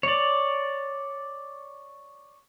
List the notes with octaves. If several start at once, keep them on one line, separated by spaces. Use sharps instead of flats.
C#5 D5